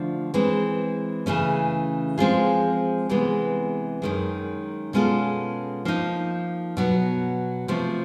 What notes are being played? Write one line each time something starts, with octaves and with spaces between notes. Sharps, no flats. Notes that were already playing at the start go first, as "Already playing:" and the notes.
Already playing: D3 F3 A3
E3 G#3 C4
C#3 E3 A3 C#4
F3 G#3 C4 F4 G#4
C3 E3 G#3 B3
F#2 D#3 G#3
B2 G#3 C#4 F4 A4
F3 A#3 D#4
B2 F#3 B3
C3 F3 A3